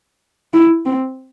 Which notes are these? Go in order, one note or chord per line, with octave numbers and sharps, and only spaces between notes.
E4
C4